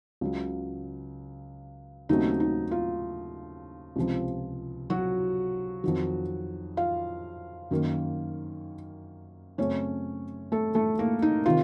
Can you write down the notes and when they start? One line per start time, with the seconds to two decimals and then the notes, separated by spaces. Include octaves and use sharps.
0.21 C#2 C#3 F#3
2.09 D#2 C#3 F#3 A3 C4 D#4
2.40 D#4
2.71 F4
3.96 C#2 C3 F3
4.90 F#3 F#4
5.84 F2 D#3 F#3
6.77 F4 F5
7.71 F#2 D#3 A#3
9.58 F#2 C#3 A3 C4 C#4 C#5
10.52 A3 A4
10.75 A3 A4
10.99 A#3 A#4
11.22 D#4
11.46 C3 D#3 F4